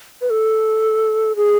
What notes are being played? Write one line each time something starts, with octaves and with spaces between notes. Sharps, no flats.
B4
A4
G#4